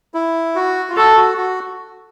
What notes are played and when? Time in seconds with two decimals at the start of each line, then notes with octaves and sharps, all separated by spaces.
0.14 E4
0.55 F#4
0.90 F4
0.96 F#4 A4
1.17 F#4
1.38 F#4